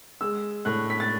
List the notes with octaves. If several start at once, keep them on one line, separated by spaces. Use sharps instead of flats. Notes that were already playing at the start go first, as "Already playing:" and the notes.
G#3 E6
A2 F#6
B6
A6